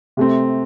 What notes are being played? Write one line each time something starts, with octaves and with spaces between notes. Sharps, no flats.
C3 A3 C4